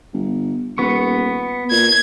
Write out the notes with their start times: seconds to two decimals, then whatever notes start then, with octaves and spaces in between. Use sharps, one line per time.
0.13 G1
0.78 D#1 B3 C#6
1.71 A#2 G#6